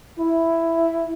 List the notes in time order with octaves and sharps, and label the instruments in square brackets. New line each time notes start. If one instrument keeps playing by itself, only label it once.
[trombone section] E4